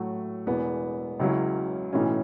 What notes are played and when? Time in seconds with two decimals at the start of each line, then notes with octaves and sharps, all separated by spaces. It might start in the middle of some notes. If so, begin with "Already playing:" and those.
Already playing: A2 F#3 A3 F#4
0.46 E1 E2 E3 B3
1.19 C#2 C#3 F#3 C#4 E4
1.93 B1 A2 E3 C#4